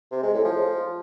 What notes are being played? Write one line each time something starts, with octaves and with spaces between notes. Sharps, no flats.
C3
G#3
A2
F3